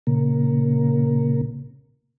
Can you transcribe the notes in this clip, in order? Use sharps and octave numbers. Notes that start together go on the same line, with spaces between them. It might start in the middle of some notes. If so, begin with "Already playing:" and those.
A#2 C#3 A#3